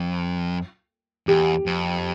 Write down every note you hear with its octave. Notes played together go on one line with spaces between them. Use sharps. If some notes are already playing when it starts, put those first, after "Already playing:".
Already playing: F2
E2 G4
F2